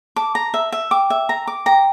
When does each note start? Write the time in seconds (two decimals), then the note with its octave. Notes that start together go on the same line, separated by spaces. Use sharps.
0.16 A5 D6
0.35 A#5
0.54 E5
0.72 E5
0.91 G5 D6
1.10 E5
1.29 A#5
1.47 D6
1.66 G5 A#5